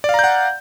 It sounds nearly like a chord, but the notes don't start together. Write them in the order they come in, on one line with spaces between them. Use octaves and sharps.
D5 F5 A#5 G6 F#5